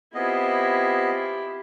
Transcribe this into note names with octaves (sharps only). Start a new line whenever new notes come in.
B3 C4 E4 F4 G4 G#4 D#5